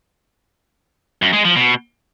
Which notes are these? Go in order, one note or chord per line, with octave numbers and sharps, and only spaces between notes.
F#2
G#3
F3
B2